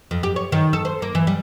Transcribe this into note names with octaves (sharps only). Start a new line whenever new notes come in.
F2
G4
C#5
D#3
A4
C5
A#3
E3
G3